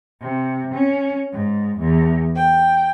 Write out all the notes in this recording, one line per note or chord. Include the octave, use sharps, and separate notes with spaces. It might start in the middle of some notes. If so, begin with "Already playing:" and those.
C3
C#4
G#2
E2
G5